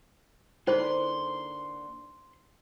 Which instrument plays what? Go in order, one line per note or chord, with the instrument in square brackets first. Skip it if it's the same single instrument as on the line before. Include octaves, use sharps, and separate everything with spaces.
[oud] D3 A#3 B4 [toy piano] D#4 E4 C5 [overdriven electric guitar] C6